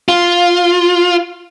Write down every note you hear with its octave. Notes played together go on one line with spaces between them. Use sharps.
F4